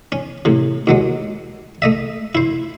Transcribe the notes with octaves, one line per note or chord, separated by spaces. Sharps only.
C#4
A2 C3
D#2 F#3 G#3
A3 D#5 E5
E4 C5